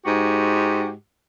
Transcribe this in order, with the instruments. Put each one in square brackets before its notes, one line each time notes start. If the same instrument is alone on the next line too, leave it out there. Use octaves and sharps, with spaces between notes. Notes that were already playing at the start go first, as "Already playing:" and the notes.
[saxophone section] G#2 F#4 G4